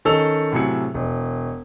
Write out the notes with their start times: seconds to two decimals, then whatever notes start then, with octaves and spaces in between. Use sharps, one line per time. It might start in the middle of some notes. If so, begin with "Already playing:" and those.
0.05 D#3 C#4 A4 E6 F7
0.52 A2 C3 F#3 G#4 C#7
0.94 E1